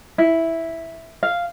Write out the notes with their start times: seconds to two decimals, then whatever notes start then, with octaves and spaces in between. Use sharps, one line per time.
0.18 E4
1.23 F5